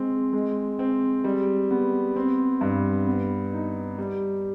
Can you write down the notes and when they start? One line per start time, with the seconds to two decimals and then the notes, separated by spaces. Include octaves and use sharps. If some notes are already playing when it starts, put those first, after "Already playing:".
Already playing: G#3 C4
0.33 G#3
0.79 C4
1.24 G3
1.71 B3
2.16 C4
2.61 G2
3.07 B3
3.53 D#4
3.98 G3